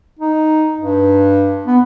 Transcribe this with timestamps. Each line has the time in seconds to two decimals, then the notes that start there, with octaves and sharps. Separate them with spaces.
0.19 D#4
0.77 G2
1.67 B3